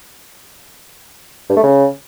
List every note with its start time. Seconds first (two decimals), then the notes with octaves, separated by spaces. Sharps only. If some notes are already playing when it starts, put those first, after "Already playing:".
1.50 G2
1.56 A3
1.63 C#3